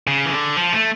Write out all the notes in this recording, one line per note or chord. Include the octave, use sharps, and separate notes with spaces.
C#3
E3
D3
F3
A3